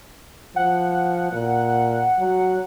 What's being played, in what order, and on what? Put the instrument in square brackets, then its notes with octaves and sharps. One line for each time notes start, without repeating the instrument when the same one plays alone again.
[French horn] F3 [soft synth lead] F#5
[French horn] A#2
F#3